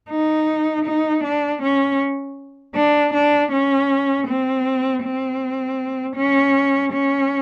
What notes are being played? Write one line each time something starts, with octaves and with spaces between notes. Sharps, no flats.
D#4
D#4
D4
C#4
D4
D4
C#4
C4
C4
C#4
C#4